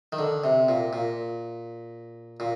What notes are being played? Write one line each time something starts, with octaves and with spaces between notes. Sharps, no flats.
D#3
D3
C3
A#2
A#2
A#2